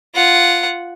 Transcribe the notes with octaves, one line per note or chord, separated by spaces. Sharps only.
F4 F#5